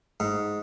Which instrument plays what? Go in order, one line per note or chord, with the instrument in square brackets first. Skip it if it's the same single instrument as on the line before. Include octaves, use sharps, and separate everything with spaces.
[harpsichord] G#2